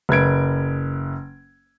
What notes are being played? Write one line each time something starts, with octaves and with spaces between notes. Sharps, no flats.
F#1 B4 G#6 D7